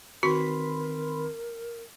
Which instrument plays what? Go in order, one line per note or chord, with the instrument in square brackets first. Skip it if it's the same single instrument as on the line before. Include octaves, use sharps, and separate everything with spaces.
[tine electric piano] D#3 C4 B4 [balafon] F#4 [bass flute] A#4 [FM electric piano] B5 C6